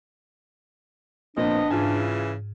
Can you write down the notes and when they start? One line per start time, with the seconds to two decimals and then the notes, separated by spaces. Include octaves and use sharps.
1.37 A#2 F3 B3 C4 D4 D#5
1.70 G#2 C#3 E3 F4 G#5